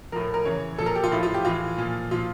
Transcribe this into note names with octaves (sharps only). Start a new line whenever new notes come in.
A2 F3 A#4
A#4
C#3 E3 C#5
A#2 F3 A4
A#4
G4
F4
A2 F3 E4
F4
G4
A2 E3 F4
A#2 F3
A#2 F3 F4